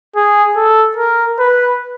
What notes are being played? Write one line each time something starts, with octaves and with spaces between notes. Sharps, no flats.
G#4
A4
A#4
B4